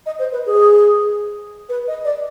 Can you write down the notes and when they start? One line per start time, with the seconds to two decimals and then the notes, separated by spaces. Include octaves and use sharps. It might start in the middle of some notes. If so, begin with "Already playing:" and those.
0.06 D#5
0.19 C5
0.32 B4
0.46 G#4
1.69 B4
1.87 D#5
2.04 D5